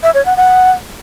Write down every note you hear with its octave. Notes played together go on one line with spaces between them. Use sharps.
E5
C#5
F#5
F#5